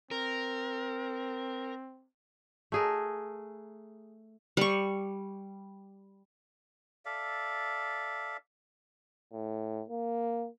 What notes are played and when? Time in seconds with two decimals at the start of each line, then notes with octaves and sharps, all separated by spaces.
0.11 C4 A#4
2.72 A3 G#4 A#4
4.57 G3 C#6
7.05 A4 D5 E5 F5
9.32 A2
9.89 A#3